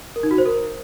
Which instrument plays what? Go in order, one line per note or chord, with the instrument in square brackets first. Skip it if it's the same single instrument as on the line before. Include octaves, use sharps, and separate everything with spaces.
[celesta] A#4
D#4
F#4
C5
A#4